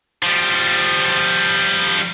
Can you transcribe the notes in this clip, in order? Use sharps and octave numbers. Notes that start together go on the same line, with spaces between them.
F3 G3